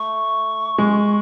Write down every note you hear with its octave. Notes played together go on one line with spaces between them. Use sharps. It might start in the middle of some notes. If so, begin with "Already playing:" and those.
Already playing: A3 C#6
G#3